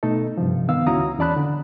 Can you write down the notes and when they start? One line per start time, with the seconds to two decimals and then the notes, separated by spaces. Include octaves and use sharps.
0.03 B2 A3 D#4 A4
0.38 G2 C3 F3
0.69 D#3 B3 F5 E6
0.87 C#2 C#4 E4 F#4 A#5 D#6
1.19 E2 C#4 D5 A5 B5 F#6
1.37 D3